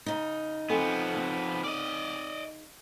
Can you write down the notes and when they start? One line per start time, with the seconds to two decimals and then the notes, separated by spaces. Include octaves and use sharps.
0.06 C#3 D#4
0.70 F3 B3 C4 A4 G#5
1.16 C4
1.64 D5 D#5